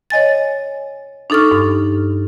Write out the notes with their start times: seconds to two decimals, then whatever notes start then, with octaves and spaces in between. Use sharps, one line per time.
0.10 C#5 D#5 G#5 A6
1.30 D4 D#4 A4 C#6 F6
1.51 G2